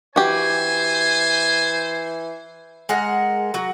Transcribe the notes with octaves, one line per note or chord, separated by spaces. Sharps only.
E3 F#4 G4 C5 G#5
G#3 A#4 F#5
F#3 F#4